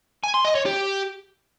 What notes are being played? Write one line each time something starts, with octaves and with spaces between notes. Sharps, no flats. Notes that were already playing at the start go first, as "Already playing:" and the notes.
G#5
C6
D#5
C#5
G4